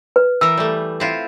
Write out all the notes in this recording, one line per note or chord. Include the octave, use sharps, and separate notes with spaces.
B4
E3 A#4 E6
G3 A3
C4 E4 F4